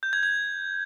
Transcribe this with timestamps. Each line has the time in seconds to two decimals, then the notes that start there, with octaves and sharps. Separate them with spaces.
0.03 G6
0.13 G#6
0.23 G#6